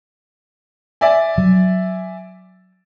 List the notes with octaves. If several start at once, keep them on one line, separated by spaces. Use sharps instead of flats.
D5 E5 G#5
F#3